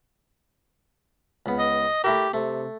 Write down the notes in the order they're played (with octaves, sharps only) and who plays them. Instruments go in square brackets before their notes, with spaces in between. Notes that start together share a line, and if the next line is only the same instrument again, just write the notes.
[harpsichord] C#2 B3
[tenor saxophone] D#5
[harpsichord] A3 E4 A#4 [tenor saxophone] G4
[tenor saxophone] C3 [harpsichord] A3